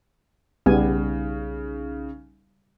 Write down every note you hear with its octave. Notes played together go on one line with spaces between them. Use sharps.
B1 C#3 G3 B3 D#4 G#5